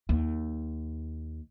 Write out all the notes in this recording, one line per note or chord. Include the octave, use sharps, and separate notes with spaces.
D#2